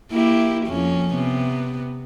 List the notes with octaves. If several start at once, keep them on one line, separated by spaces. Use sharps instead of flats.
A#3 E4 G4
F2 A#3 C#4
C3 B3